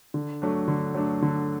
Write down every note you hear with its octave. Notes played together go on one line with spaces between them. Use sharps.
D3
F#3 A3 D4
D3
F#3 A3 D4
D3